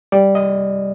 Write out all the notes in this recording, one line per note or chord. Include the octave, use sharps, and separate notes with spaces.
G3 D5
D#5